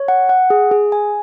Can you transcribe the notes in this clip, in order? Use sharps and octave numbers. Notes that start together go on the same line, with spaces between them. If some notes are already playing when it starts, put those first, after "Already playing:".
Already playing: C#5
F#5
F#5
G#4
G#4
G#5